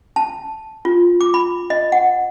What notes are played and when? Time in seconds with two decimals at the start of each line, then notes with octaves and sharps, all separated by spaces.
0.16 A5
0.85 F4
1.21 D6
1.34 B5
1.70 D#5
1.92 F#5